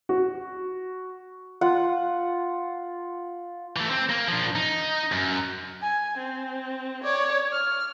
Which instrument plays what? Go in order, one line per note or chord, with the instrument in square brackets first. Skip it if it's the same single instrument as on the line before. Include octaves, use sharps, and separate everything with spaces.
[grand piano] F#4
[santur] F4 F#5
[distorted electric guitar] E3 A3
C4
A#3
F3 D4
D#4
F#2
[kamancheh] G#5
C4
C#5 D5
F6